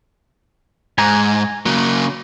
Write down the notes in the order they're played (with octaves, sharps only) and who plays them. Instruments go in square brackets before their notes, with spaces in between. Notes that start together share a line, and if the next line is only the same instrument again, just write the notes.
[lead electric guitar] G#2 [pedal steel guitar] G#5 A#5
[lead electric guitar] C#3 F#3 [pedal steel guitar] A#3